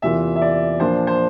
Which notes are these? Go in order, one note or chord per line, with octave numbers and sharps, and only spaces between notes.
E2 C3 E3 A#3 F4 E5
E5
D5
A#2 F3 A#3 D4 F4 C5
C5